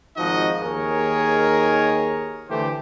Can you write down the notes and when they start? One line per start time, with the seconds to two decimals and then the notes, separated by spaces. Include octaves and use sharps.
0.17 G#1 F3 D#4 F#4 D#5
0.62 D#2 D#3 G#4 A#4 C#5
2.49 D3 E3 A3 G4 C5